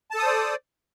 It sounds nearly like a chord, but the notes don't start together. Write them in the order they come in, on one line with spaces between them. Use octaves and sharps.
A5 A4 D#6 C5 D5